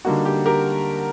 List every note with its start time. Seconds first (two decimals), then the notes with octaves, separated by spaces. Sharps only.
0.05 D3 G3 A#3 D#4 F#4
0.25 G4
0.46 G4 A#4